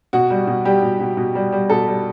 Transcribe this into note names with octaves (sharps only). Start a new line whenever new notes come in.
B2 F#4
G3
B2
G3 G4
B2
B2
B2
G3
G3
B2 A4
G3